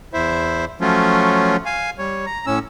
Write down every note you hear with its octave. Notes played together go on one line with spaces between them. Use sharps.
E2 E4 C5 E5
F3 F#3 A3 C#4 F4
F5 G#5
G3 C#5
A#5
A2 C#4 E6